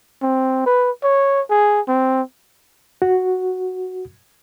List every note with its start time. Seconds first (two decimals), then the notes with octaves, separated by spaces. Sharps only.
0.22 C4
0.66 B4
1.03 C#5
1.50 G#4
1.88 C4
3.02 F#4